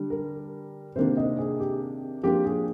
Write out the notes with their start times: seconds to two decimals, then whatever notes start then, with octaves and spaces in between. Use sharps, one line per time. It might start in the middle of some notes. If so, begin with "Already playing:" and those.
Already playing: D3 G3 D4
0.10 A#4
0.96 C3 D#3 A#3 D4 C5
1.17 D#5
1.38 G#4
1.60 G4
2.23 F3 A#3 D4 G4
2.45 G#4